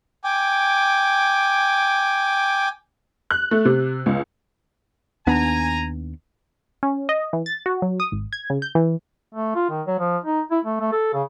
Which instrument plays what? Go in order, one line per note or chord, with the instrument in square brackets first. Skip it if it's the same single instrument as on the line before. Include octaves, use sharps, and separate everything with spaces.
[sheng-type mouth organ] G5 G#5 D6
[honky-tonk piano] F#6
A3
C3
C#2
[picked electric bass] D#2 B3 D4 [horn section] G#5 A#5
[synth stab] C#4
D#5
E3
A6
F#4
F#3
D#6
G#1
G#6
C#3
G6
E3
[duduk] A3
F4
D#3
F#3
F3
D#4
E4
A3
A3
A4
C#3